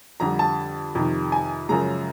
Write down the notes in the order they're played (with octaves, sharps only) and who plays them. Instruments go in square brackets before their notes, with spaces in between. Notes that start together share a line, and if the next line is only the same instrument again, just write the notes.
[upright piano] F2 D3 G3 A#5
A5
F2 C3 D#3
G#5
F#2 C#3 F3 G#3 A#5